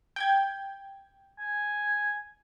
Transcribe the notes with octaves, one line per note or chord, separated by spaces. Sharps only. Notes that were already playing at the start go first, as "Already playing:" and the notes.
G5 G6 G#6
G#5